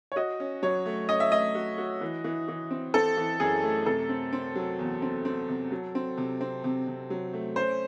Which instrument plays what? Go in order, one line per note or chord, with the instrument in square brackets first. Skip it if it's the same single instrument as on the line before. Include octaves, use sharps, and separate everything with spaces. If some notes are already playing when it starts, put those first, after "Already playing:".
[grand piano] C#5
[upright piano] F#4 [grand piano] D#5
[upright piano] C#4
[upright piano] F#3 [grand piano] C#5
[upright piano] A3
[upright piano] C#4 [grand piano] D#5
[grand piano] E5
[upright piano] A3 [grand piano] D#5
[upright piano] F#4
F#4
E3
E3
E3
C4
[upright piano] C4 [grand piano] A4
[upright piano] E3
[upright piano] F#2 [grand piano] G#4
[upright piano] A3
[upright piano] C3 [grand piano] A4
[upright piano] C4
C4
F#3
E2
C4
C4
C3
F#3
C4
C3
C4
C3
C3
F#3
A3
[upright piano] C#4 [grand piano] C5